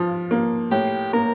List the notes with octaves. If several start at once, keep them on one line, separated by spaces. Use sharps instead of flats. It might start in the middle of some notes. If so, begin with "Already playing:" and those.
Already playing: F3 F4
A#3
A2 G4
A#3 A#4